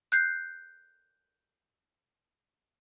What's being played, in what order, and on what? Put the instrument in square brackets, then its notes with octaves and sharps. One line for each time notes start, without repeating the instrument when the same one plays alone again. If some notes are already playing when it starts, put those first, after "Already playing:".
[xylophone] F#6 G6 C7